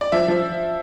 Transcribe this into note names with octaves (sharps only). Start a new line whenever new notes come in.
D5
F3 E5
F3